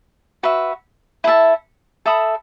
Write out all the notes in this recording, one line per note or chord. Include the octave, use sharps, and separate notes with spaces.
F#4 B4 E5
E4 A4 E5 A5
A4 E5 B5 D#6